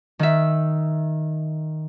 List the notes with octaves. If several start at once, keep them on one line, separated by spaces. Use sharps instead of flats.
D#3 E5